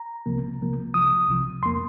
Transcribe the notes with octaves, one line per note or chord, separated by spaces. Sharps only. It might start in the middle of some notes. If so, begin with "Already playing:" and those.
Already playing: A#5
C2 C3 F3 A#3
C2 C3 F3 A#3
C2 C3 F3 D#6
C2 C3 F3
F2 F3 A#3 C6